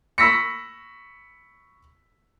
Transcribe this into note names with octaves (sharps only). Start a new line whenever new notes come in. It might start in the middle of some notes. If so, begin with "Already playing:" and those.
B5 C#6 E6 A#6 B6 C#7